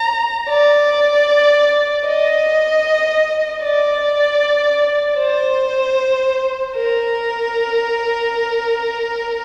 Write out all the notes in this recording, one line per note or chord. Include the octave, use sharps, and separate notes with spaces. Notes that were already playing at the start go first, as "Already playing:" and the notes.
Already playing: A#5
D5
D#5
D5
C5
A#4